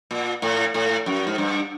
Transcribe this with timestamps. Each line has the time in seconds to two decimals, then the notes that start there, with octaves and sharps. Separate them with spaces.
0.11 A#2
0.42 A2
0.74 A2
1.06 F#2
1.27 G#2
1.38 G2